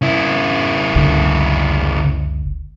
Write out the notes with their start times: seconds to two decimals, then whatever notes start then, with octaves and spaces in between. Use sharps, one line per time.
0.02 C#3 E4
0.95 F#1 C#2 D3